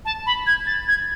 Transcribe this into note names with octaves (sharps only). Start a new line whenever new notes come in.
A5
B5
G#6
A6
G#6